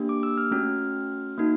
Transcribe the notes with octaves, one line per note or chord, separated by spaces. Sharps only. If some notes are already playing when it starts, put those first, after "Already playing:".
Already playing: A#3 D4 G4
D6
E6
F6
A3 C#4 F#4 F6
A#3 D#4 F#4